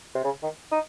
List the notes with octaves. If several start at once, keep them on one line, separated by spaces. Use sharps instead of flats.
C3
C#3
D#3
D#4